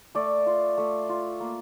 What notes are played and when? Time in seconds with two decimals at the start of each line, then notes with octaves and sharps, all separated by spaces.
0.15 A3 D5
0.46 F4
0.78 A3
1.09 F4
1.40 A#3